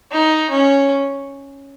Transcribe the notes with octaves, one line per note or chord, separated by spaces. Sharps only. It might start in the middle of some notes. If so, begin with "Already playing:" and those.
D#4
C#4